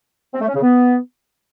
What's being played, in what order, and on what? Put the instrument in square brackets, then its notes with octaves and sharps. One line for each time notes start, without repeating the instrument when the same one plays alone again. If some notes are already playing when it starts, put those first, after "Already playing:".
[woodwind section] C4
A3
C#4
C#3
B3